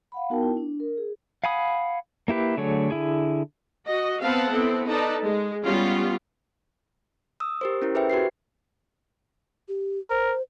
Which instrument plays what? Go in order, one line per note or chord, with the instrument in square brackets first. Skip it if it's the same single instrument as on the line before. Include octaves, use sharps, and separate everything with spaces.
[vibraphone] F5 F#5 B5
B3 D#4 F#4 A#4 G5 A5
E4
D4
A#4
G#4
[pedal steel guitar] F5 F#5 G#5 B5 D#6
A#3 E4 G4 B4
D3 F#3 A3 G#4 C#5
D3 E4 G#4
[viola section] F#4 D#5
B3 C4 B4 F5 F#5 A5
B3 C4 E4 A4
D#4 A4 B4 D5 A5
G#3
G3 B3 C#4 F4
[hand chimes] D#6 E6
G4 A#4 C5
C#4 E4 A#4
G#4 B4 C5 E5 G5
F#4 G4 B4 C7
[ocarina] G4
[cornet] A#4 [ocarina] C5